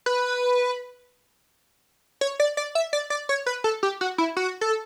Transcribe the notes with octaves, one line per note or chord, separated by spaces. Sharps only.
B4
C#5
D5
D5
E5
D5
D5
C#5
B4
A4
G4
F#4
E4
F#4
A4